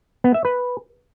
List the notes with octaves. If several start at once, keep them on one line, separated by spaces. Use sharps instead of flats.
B3
E5
B4